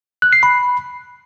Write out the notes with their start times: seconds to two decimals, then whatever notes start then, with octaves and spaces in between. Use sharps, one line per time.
0.22 F#6
0.33 C7
0.43 B5